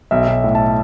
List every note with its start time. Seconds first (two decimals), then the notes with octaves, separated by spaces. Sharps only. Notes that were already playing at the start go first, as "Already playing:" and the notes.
0.11 B1 E5
0.28 B1
0.44 A2
0.55 A5